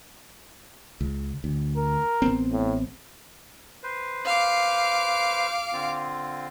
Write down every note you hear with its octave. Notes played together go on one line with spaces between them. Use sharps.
C#2
D2
A#4
A1 B3 C4
A2
B4 C5
F5 D6
D3 C4 F4